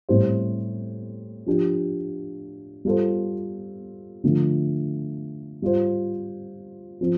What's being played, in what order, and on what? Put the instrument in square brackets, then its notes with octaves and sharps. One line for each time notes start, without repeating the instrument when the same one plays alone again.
[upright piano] A2 G3 C4 G4 C5
F3 D4 G4
G3 F4 A4 C5
D3 F3 A3
G3 F4 C5
F3 C4